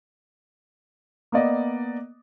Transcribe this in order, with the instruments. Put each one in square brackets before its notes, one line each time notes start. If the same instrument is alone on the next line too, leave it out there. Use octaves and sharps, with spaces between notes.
[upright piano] A#3 B3 D5 D#5